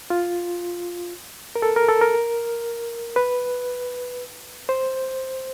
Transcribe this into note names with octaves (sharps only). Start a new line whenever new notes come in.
F4
A#4
A4
A#4
A4
A#4
B4
C5